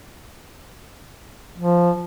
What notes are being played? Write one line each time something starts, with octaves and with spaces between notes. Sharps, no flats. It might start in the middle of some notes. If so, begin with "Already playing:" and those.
F3